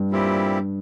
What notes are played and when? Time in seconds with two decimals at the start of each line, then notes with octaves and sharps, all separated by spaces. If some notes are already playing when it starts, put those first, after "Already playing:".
Already playing: G2
0.10 A#2 G3 C4 E4 G4